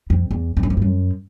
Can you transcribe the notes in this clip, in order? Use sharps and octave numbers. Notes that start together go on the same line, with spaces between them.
F2
E2
F2
F#2
F2
G2
F#2